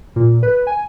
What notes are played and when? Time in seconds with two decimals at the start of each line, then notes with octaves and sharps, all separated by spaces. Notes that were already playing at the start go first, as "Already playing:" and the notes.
0.16 A#2
0.43 B4
0.67 G#5